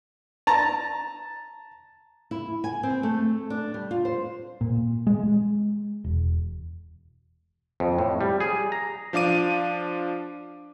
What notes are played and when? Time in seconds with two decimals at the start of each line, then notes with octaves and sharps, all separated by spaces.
0.47 A5 A#5
2.31 E4
2.64 G#5
2.83 C4
3.03 A3
3.50 D4
3.74 G3
3.91 F4
4.05 C5
4.61 A#2
5.07 G#3
6.04 E1
7.80 F2
7.98 A2
8.21 G3
8.40 G#4
8.72 A#5
9.13 F3 D4 F5 D6 D#7